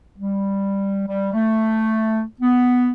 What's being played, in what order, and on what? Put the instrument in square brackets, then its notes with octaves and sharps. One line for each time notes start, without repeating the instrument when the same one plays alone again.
[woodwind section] G3
G3
A3
B3